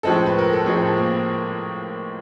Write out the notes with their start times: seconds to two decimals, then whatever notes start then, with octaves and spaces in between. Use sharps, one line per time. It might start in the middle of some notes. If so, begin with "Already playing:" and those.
0.03 A2 F3 G#3 C4 A4
0.26 B4
0.38 A#4
0.53 A4
0.66 A2 F3 G#3 C4 G#4
0.81 A4
0.97 A#3 A#4